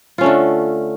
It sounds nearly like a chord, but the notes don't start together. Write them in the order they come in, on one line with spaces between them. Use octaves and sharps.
F4 C#4 A3 D3